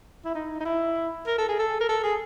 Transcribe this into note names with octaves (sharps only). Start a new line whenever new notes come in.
E4
D#4
D#4
E4
A#4
A4
G#4
A4
A#4
A4
G#4